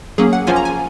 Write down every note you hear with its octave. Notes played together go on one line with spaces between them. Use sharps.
F#3 A#3 C#4 G#4
F#5
F3 A#3 C#4 F4 G#5
A#5
G#5